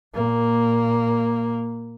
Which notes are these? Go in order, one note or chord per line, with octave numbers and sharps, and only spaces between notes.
A#2 A#3